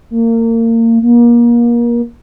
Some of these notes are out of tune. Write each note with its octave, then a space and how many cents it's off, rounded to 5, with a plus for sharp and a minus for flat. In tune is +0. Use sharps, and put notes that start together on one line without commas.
A#3 -30
A#3 +30